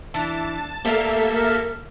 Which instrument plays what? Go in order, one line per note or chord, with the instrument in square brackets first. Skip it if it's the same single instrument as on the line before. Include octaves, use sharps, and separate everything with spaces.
[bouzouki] E3 [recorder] D4 [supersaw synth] A5
[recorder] A3 [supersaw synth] A#3 A4 E5 [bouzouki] G4 F5
[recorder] A#4